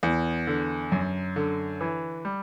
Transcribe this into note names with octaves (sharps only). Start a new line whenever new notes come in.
E2
D3
F#2
D3
E3
G3